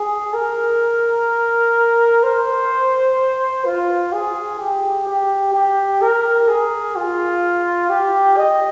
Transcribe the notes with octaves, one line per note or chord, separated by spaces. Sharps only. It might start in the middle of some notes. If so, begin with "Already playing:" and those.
Already playing: G#4
A#4
C5
F4
G#4
G4
G4
G4
A#4
G#4
F4
G4
D#5